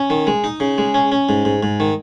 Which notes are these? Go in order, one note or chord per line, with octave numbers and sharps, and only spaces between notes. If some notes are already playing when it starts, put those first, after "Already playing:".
Already playing: C#4
D#3
G#3
D#4
C#3
G#3
C#4
C#4
G#2
G#2
G#2
D#3